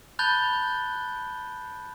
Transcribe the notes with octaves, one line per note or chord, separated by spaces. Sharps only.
A5 B5 F#6 G6 A6 G7